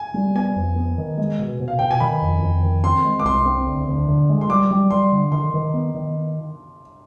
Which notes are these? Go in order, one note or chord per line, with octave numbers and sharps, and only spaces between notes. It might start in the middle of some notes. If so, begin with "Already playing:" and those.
Already playing: G#5
G3
B3 G#5
F2
B3
D#3
G#3
B2
B2
F5
B2 G5
G#5
D#3 B5
F2
F2
D#3
C4 C6
G#3
D6
C2 C6
C4
D2
D2
D3
G#3
C6
G3 D6
G3
G3 C6
D3
D#3 C6
D#3
B3
D#3